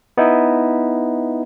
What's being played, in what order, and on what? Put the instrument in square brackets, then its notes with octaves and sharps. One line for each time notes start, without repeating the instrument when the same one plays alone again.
[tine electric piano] B3 D#4 E4